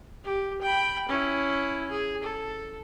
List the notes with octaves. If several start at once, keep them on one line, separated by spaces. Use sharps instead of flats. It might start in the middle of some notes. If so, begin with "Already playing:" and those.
G4
G5 B5
C#4 E4
G#4
A4